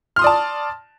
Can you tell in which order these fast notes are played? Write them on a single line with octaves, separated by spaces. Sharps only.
F6 C6 D#6 D5 A5